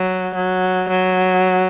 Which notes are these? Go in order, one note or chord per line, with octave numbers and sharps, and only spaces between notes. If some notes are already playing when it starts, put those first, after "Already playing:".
Already playing: F#3
F#3
F#3